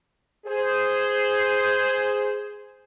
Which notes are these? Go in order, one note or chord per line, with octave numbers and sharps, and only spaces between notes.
G#4 C5